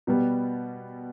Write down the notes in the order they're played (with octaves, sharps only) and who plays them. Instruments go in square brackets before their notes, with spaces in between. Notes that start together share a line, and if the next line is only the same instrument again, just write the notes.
[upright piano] B2 G3 B3